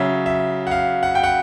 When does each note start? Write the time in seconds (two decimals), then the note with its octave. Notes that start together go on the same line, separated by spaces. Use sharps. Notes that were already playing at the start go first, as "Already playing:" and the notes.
Already playing: C#3 F#3 E5
0.26 E5
0.67 F#5
0.71 F5
1.03 F#5
1.15 G5
1.24 F#5